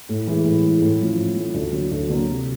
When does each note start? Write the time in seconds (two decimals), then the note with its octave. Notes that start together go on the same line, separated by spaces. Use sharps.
0.09 A2
0.27 E3 G#3
0.44 A2
0.62 E3 G#3
0.82 A2
1.00 F3 A3 C#4
1.18 A2
1.35 F3 A3 C#4
1.54 D2
1.72 D3 F#3 A#3
1.91 D2
2.09 D3 F#3 A#3
2.28 C3